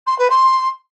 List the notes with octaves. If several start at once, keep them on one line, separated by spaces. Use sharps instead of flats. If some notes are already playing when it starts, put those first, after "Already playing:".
C6
B4
C6